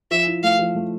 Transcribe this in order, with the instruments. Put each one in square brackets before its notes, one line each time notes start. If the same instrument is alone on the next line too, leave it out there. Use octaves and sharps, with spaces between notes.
[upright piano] F3 [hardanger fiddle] E5
[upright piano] E4
[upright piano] A3 [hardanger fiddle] F5
[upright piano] F3
A3